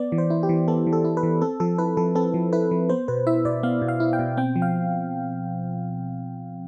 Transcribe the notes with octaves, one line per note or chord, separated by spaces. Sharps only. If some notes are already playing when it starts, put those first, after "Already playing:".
Already playing: B3 D5
E3
C5
E4
G4
E3
B3 A4
E3
A4
E4
B4
E3
C4 A4
F3 A4
E4 B4
F3 A4
C4 A4
F3
E4 B4
F3
B3 C5
B2 B4
E4 E5
B2 D5
B3 F5
B2
F5
E4
G5
B2
C4 G5
F3
F5